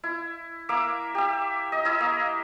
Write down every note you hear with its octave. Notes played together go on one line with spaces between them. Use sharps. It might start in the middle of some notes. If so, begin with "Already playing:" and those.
E4
A#3 E5 D6
G4 E5
D#5
E4 D#5 E5
A#3